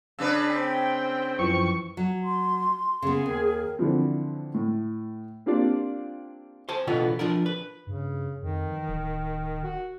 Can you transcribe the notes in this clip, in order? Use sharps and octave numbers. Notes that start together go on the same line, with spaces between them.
C#3 D4 B4 E6
C4 G5
F#2 E3 F3 C#6
F#3
C6
C#3 B3 G#4
D#2 A#4
D3 E3 F3 C4
A2
A#3 C4 D4 F4 G4 D5
C5 G#5 A5
B2 D3 E3 B3 F4
F3 D4 A#4
B4
G2 C#3
F2 D#3
E3
D1
F#4